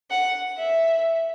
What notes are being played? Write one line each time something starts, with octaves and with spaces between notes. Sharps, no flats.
F#5
E5